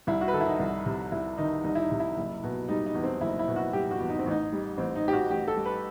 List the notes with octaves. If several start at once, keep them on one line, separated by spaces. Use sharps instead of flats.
C2 E4
F#4
B4
D#3 A4
E4
D#4
C2
C3
C2 E4
D#3 D#4
C2 D#4
E4
D#4
C3
E4
F#1
B2
G3 D#4
D#4
E2
C4
F#1 E4
E4
B2
F#4
G3 G4
F#4
E2
D#4
C4
A1 D#4
G3
A1 C4
D#4
A2 G4
F#4
A1 G4
A4
G3
B4